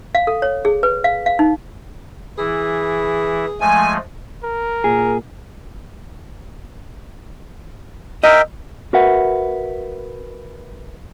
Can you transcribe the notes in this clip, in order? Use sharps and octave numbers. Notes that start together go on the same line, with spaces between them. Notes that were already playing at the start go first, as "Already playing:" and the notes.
F5
A4
C#5
G#4
B4
F5
F5
D#4
E3 E4 G#4
F3 G#3 A3 G#5
A#4
A#2 G#4
A#4 D#5 E5 G5
F#4 A#4 B4 E5 F#5